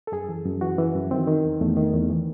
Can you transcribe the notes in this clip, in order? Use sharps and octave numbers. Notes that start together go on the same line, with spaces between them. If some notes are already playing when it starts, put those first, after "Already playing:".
A4
F#2 G#4
E3
F#2
E3 F#4
E3
F#2
D#3 C4
D#3
E2
E2 A3
D#3
E2
E3